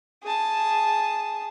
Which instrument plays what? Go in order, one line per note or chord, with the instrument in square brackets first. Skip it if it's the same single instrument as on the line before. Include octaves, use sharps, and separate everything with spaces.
[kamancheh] G#4 A5